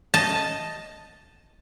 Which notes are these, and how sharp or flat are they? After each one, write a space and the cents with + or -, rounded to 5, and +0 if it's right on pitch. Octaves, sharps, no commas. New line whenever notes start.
D#5 +0 A5 +0